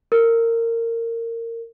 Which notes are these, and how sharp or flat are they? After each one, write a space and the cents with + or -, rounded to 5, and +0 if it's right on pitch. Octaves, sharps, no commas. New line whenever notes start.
A#4 -20